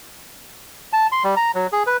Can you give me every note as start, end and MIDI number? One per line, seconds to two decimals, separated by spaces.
0.93 1.07 81
1.12 1.23 84
1.24 1.35 55
1.36 1.51 82
1.55 1.67 54
1.72 1.83 68
1.87 1.97 71